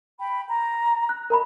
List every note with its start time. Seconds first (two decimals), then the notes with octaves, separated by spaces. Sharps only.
0.19 G5 B5
0.48 A#5
1.09 F#6
1.30 A#4 D#5 A#5 B5